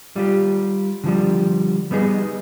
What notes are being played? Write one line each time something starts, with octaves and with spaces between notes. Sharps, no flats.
G3 F4 G4
D3 F3 G3
G3 B3 D#4 G#4